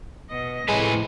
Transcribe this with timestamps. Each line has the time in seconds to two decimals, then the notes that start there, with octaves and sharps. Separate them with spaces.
0.30 B2 D#5
0.69 F2 A2 C3 G#3 A3 B4 G#5